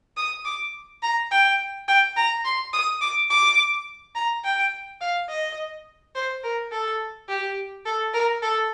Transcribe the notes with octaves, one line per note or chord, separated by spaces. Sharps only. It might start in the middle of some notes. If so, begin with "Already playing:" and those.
D#6
D6
A#5
G5
G5
A#5
C6
D#6
D6
D6
A#5
G5
F5
D#5
C5
A#4
A4
G4
A4
A#4
A4